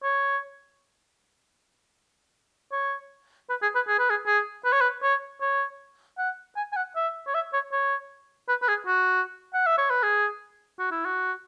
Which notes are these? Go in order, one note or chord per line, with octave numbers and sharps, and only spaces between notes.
C#5
C#5
B4
G#4
B4
G#4
B4
G#4
G#4
B4
C#5
B4
C#5
C#5
F#5
G#5
G#5
F#5
E5
C#5
E5
C#5
C#5
B4
B4
G#4
F#4
F#5
E5
C#5
B4
G#4
F#4
E4
F#4